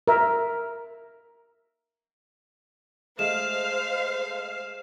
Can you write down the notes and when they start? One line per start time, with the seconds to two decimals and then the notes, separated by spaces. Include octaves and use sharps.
0.08 A#4 E5
3.19 G#3 A3 C5 F5 E7